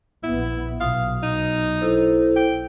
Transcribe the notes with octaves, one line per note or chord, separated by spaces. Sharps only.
A#1 B3 E4
B1 F5 D#6
D#4
E4 A4 C5
G5